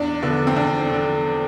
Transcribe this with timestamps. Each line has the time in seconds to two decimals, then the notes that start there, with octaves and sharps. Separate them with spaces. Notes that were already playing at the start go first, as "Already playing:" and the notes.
Already playing: E2 D4
0.23 D3 F3 B3
0.47 C4
0.56 E2 D4
0.90 D3 F3